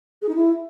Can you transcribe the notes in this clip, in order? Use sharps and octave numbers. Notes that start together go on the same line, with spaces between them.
G#4
D#4
E4